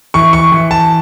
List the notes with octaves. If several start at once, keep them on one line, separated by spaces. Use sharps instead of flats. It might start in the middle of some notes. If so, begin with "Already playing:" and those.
E3 C#6
C#6
E3
A5